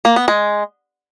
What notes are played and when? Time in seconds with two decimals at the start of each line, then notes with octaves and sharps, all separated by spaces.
0.05 A#3
0.16 B3
0.28 G#3